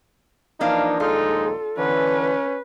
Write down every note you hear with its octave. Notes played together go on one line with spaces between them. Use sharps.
E3 F3 A#3 D4 D#4 F5
A#1 D#2 G#3 D#4 F4 A4
D3 E3 C#4 B4